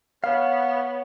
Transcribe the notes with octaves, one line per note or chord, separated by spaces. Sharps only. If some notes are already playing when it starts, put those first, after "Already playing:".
B3 C#5 F5